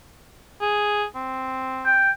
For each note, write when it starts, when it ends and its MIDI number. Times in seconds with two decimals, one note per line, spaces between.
0.61 1.05 68
1.16 2.02 60
1.86 2.11 79